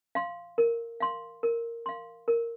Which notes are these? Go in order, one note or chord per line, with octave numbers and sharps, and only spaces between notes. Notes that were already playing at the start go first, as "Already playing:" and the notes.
F5 C6
A#4
F5 C6
A#4
F5 C6
A#4